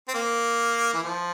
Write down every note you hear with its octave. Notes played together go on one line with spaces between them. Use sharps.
C4
A#3
E3
F3